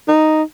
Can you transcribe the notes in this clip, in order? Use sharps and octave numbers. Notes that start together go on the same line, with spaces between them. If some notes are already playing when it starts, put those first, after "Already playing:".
D#4